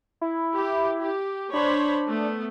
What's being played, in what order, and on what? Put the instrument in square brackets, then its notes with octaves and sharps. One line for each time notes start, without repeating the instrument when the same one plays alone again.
[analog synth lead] E4
[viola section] G4
G4
[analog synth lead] D4 [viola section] C5 C#5 B5
[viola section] A3 B3